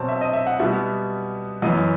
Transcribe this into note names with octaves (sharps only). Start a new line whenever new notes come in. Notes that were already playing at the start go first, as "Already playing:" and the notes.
Already playing: B2 F#3 C4 A5
E5
D#5
E5
F#5
B2 G3 B3 E5
F#2 E3 B3 D#5